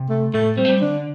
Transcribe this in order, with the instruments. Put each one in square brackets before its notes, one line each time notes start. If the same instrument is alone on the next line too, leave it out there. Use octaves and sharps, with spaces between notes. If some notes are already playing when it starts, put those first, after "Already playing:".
Already playing: [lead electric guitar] C3
[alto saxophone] A3
[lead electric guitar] A2 [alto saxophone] A3
[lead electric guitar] A2
[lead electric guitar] G3 [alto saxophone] C4
[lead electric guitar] A3
G3
[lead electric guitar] D3 [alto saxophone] D4